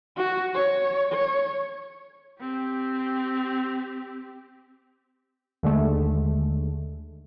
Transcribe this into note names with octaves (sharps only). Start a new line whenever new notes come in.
F#4
C#5
C#5
C4 G4
D#2 D3 G#3 A3